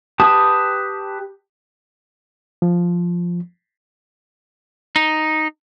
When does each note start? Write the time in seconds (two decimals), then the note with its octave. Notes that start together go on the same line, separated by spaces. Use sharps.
0.20 G4 B4 A5 D#6
2.62 F3
4.96 D#4